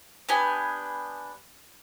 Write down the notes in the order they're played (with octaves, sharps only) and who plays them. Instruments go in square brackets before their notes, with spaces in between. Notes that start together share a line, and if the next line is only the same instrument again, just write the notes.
[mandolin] B3 D4 G4 G#5